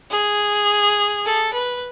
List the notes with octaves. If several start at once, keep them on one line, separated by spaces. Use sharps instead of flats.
G#4
A4
B4